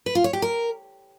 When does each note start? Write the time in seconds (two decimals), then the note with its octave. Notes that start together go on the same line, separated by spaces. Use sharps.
0.06 B4
0.15 F4
0.24 C#5
0.33 G4
0.42 A#4